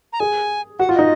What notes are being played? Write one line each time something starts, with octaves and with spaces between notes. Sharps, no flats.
A#5
G#4 G#5
F#4 F#5
F4
D#4 D#5